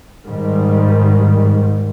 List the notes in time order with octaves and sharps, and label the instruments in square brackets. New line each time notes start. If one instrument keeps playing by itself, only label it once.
[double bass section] G#2 D#3 G3